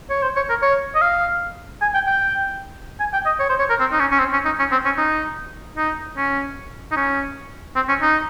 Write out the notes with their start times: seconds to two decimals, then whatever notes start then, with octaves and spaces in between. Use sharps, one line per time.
0.10 C#5
0.22 C5
0.36 C#5
0.50 A#4
0.62 C#5
0.95 D#5
1.02 F5
1.82 G#5
1.94 G5
2.07 G5
3.00 G#5
3.13 G5
3.26 D#5
3.40 C#5
3.49 C5
3.59 C#5
3.70 A#4
3.80 C4
3.92 D#4
4.00 C#4
4.11 C#4
4.19 C4
4.33 C#4
4.45 D#4
4.59 C#4
4.72 C4
4.85 C#4
4.98 D#4
5.77 D#4
6.17 C#4
6.91 D#4
6.97 C#4
7.76 C4
7.89 C#4
8.02 D#4